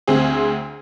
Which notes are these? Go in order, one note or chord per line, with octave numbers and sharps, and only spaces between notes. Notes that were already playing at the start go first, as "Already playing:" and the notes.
D2 C4 G#4